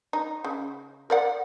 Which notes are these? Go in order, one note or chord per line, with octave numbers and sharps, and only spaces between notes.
D#4
C#3
A#4 D5 F#5